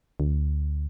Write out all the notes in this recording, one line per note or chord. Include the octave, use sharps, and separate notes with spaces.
D2